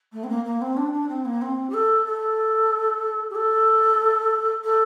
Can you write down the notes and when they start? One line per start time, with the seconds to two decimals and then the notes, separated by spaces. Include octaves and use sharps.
0.13 A3
0.24 C4
0.29 A#3
0.45 A#3
0.61 C4
0.77 D4
0.93 D4
1.09 C4
1.25 A#3
1.41 C4
1.69 G4
1.74 A4
2.06 A4
3.30 G4
3.35 A4
4.64 A4